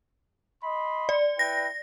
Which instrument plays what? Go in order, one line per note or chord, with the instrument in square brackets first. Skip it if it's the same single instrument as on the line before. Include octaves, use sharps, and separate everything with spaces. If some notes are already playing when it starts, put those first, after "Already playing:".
[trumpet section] D#5 B5 C6
[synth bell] D5
[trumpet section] E4 B4 G5 [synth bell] A#6